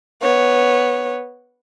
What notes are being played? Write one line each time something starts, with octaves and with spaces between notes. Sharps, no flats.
B3 C#5